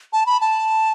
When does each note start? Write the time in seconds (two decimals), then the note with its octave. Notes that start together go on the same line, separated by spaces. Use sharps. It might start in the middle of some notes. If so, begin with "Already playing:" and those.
0.13 A5
0.26 B5
0.41 A5